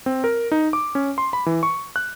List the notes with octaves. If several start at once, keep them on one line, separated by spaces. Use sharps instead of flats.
C4
A#4
D#4
D6
C#4
C6
B5
E3
C#6
F#6